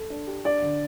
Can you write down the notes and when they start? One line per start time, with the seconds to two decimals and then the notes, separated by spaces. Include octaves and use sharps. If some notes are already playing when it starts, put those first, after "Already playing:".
Already playing: A4
0.10 D4
0.27 G4
0.45 D4 D5
0.62 D3